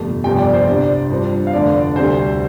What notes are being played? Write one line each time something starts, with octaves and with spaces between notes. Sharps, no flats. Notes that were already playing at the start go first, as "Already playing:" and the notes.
Already playing: G1 F2 C3 A3
G1 F2 C3 G3 G5
D5
C5
C2 C3 G3 D4 D5
G2 F3 C4
F5
F1 F2 D3 A3 D4 D5
D2 C3 G3 C4 C5